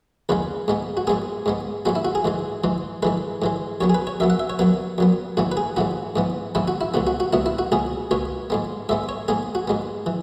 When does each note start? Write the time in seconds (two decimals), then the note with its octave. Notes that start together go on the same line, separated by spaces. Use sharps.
0.29 E2 C#3 G#3 B4
0.68 G#2 G#3 B3
0.97 F#4
1.07 G#2 G#3 B3 G#4
1.46 G#2 G#3 B3
1.86 G#2 G#3 B3 F#4
1.95 E4
2.05 F#4
2.15 G#4
2.24 G#2 E3 G#3
2.64 G#2 E3 G#3
3.03 G#2 E3 G#3 B4
3.42 G#2 E3 G#3
3.81 F#2 F#3 B3 C#5
3.90 G#4
3.95 B4
4.07 C#5
4.20 F#2 F#3 B3 E5
4.30 F#5
4.40 E5
4.50 C#5
4.59 F#2 F#3 B3 B4
4.98 F#2 F#3 B3
5.37 G#2 E3 B3 F#4
5.52 B4
5.57 G#4
5.76 G#2 E3 B3 F#4
6.16 G#2 E3 B3
6.55 G#2 E3 B3 E4
6.68 F#4
6.81 E4
6.94 C#2 B2 B3 F#4
7.07 F#4
7.20 F#4
7.33 C#2 B2 B3 E4
7.46 E4
7.59 F#4
7.72 C#2 B2 B3 G#4
8.11 C#2 B2 B3 C#5
8.50 G#2 G#3 B3
8.89 G#2 G#3 B3 E5
9.09 C#5
9.28 G#2 G#3 B3 G#4
9.55 F#4
9.68 G#2 G#3 B3
10.06 E3